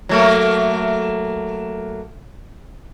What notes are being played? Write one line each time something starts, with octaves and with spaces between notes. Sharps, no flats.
F#3 A3 A#3